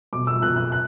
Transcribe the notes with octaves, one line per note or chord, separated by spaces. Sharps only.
B2 D6
E6
B2 F#6
F#6
F#6